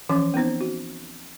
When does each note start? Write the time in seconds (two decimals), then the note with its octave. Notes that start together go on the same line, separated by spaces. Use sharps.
0.09 E3 F3 C#4 D6
0.34 B3 C4 D#4 C5
0.61 F#4